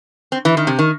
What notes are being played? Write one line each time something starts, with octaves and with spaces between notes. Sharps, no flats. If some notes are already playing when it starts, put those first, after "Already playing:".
C4
E3
D#3
C3
D#3